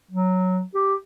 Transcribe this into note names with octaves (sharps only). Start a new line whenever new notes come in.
F#3
G4